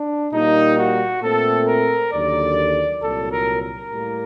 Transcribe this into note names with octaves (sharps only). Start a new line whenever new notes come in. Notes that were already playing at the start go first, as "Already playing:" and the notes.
Already playing: D4
A#2 G3 A#3 D#4
F#4
A#2 A3 C4 A4
A#4
D#2 D3 F#3 D5
C2 A#2 F#3 A4
A#4
A#4
A2 G3 A#3